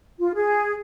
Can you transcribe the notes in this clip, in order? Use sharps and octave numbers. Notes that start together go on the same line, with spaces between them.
F4
G#4